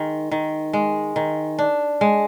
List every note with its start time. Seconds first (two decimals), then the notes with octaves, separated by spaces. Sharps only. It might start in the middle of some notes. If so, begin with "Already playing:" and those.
Already playing: D#3 G#3
0.31 D#3
0.73 G#3
1.16 D#3
1.59 D4
2.01 G#3